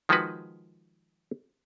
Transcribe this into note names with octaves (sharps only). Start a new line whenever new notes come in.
D#3 F3 G#3 D#4 F#4 B4